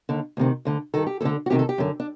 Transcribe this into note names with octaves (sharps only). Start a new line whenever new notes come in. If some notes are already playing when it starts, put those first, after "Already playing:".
D#2 D3
D2 C3 D#3
D2 D3
G2 D#3 A4
G4
D2 D3 A4
F#4
D2 C3 D#3 G4
A4
G4
F#2 D3
D4